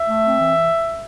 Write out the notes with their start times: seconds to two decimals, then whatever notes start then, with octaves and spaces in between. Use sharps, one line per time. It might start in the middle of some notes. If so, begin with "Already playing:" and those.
Already playing: E5
0.08 A3
0.24 C4
0.39 E3